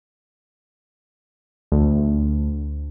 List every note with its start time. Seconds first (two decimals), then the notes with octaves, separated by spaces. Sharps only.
1.72 D2